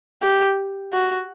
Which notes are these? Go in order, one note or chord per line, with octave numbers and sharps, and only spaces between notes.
G4
F#4